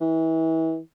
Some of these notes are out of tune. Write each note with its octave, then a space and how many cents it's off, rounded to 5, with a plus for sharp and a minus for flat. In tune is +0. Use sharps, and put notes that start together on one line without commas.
E3 -30